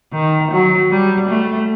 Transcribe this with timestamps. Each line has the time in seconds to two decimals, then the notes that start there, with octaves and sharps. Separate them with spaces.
0.13 D#3
0.52 F#3
0.91 G3
1.30 A3